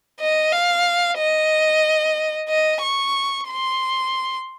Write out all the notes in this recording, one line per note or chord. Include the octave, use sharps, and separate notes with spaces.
D#5
F5
D#5
D#5
C#6
C6